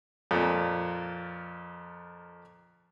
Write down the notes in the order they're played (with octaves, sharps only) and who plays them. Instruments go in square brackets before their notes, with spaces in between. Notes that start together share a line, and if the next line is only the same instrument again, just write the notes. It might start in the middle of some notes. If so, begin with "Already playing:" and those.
[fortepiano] F2 A#2